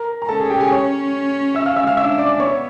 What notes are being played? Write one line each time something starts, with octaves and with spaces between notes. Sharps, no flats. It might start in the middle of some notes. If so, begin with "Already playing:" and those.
Already playing: A#4 A#5
A#5
C#4 A4 A5
G#4 G#5
G4 G5
G#4 G#5
C#5 C#6
E5 E6
F5 F6
E5 E6
F5 F6
D4 E5 E6
D5 D6
B3 C#5 C#6